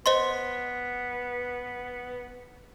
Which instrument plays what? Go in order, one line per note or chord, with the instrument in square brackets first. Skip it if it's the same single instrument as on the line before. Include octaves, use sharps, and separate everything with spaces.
[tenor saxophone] B3 [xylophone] C5 D#5 C6